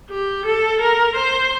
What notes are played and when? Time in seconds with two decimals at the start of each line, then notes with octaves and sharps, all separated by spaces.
0.10 G4
0.45 A4
0.80 A#4
1.15 C5